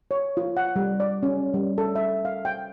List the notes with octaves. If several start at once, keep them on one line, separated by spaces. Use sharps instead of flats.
C#5
F4
F#5
G3
D5
C#4
G3
A4
E5
F5
G5